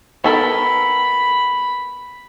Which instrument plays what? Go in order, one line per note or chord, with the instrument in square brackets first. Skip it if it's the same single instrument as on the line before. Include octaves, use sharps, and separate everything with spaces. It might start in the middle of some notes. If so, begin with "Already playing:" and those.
[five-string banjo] B3 A4 A#4 [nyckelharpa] B5